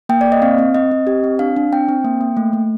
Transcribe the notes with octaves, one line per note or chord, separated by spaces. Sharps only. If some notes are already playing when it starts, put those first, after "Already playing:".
A#3 G5
D5
A#3
D#5
C4 F5
C4
C4 D#5
C4
G4
C4
D4 F5
D4
C4 G5
C4
A#3
A#3
A3
A3